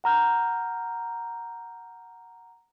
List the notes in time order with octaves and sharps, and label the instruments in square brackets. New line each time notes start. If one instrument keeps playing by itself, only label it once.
[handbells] F#5 A#5 F6 G6